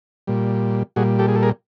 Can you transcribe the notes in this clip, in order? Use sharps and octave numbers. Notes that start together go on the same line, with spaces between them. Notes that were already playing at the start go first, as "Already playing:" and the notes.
A#2 G3
A#2 G3 F#4 G#4
G4 A4
G#4
A4
G#4 A#4